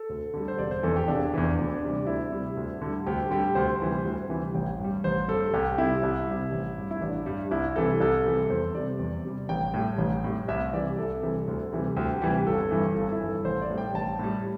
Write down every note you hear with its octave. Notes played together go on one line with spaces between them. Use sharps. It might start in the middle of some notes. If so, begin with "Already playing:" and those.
Already playing: A4
D2
D3 G3
C5
E1 D5
C5
E2 E3 A4
G4
E1 D4
E2 E3
D2
C3 G3
D2 E4
C3 G3
D2
D3 G3
D2 G4
D3 G3 G4
D2 C5
C3 E3 G3
D2
C3 E3 G3
A1 G5
G2 G3
A1 C5
G2 G3 A4
C2 G4
C3 G3 E4
C2
C3 G3
A1
G2 G3
E4
A1 D4
G2 G3
C2 E4
C3 E3 G3 A4
C2 A4
C3 E3 G3
E2 C5
C3 G3 D5
E2
C3 G3
A1 G5
A2 G3
A1
A2 G3
C2 E5
C3 E3 G3 D5
C2 A4
C3 E3 G3
D2
C3 E3 G3
D2 G4
C3 E3 G3
G1 A4
G2 E3
G1 A4
E4
G2 E3
A4
A1 C5
D5
A2 G3
G5
A1 A5
A2 G3